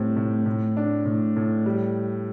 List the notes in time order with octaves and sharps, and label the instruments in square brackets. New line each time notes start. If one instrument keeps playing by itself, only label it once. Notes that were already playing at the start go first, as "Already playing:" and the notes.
Already playing: [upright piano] A2 G3 C4
A2
A2
D4
A2
A2
G3